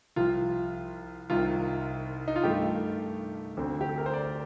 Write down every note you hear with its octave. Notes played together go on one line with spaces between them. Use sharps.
C2 C3 F3 F4
C2 C3 D#3 F4
D#4
F4
G2 D#3 A3 G4
D2 D3 A3 C4
G4
A4
A#4
C5
D5